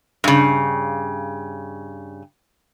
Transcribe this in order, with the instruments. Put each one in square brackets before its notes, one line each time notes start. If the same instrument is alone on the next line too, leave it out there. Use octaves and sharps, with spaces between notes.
[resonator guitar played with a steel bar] G2 C#3